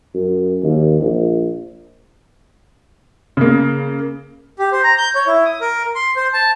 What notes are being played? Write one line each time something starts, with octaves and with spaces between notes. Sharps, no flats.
F#2
D#2
A#1
C#3 A#3
G4
C5
A#5
G6
C#5
E4
D#6
A#4
C6
C5
A5